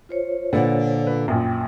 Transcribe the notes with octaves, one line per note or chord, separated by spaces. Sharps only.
F4 C5 C#5
A#2 D3 B4 F#5
B4
A#1 F#2 A#2 G5